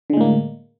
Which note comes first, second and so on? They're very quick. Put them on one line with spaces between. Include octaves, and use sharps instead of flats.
D3 G#3 A2 A#3